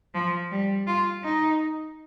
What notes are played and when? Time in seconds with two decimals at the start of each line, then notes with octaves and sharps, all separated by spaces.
0.14 F3
0.52 G3
0.87 F4
1.24 D#4